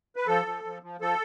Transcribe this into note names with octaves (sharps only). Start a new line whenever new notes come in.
B4
F3 A4
F3
F3
F3
F3 A4